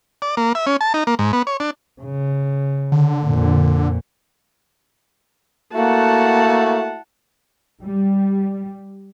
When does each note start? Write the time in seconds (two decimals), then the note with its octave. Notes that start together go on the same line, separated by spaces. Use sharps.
0.22 D5
0.37 A#3
0.55 E5
0.66 C#4
0.81 A5
0.94 D#4
1.07 A#3
1.19 G#2
1.33 B3
1.47 C#5
1.60 D4
2.01 C#3
2.92 D3
3.23 F2 A#2
5.74 A3 A#3 E4 F#4 F#5 A5
7.82 G3